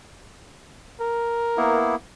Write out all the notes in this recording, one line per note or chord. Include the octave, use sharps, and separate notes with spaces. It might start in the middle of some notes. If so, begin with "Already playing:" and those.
A#4
A#3 B3 E4